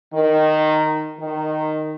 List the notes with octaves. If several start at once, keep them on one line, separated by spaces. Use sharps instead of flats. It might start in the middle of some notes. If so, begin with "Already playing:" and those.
D#3
D#3